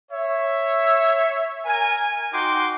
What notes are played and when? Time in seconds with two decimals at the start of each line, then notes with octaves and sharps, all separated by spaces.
0.10 C#5 E5
1.65 A#4 G#5
2.32 D#4 F#4 G5 C6 D6